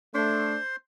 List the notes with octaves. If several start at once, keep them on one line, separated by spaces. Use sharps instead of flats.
A3 D4 C5 C6